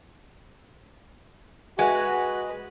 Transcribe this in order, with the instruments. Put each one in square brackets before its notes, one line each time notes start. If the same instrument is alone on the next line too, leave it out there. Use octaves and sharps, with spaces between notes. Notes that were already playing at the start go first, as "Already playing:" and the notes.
[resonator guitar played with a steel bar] G#3 [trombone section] F#4 [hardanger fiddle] B4